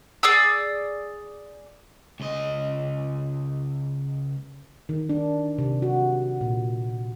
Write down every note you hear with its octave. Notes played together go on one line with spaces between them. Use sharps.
G#4 D5 D#6 E6
C#2 D#5
D#3
D4
C3
F#4
A#2